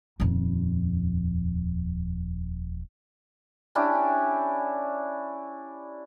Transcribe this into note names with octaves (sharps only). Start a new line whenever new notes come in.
D#1 F2
C#4 D4 E4 G4